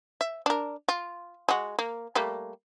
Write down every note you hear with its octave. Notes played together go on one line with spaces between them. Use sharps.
E5
D4 A#4
F4
G#3 F#4
A#3
G3 A3 A#3